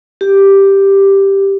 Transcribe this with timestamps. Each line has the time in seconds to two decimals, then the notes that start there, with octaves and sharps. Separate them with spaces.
0.21 G4